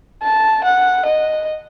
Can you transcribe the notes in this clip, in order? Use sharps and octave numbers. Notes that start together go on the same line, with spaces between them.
A5
F#5
D#5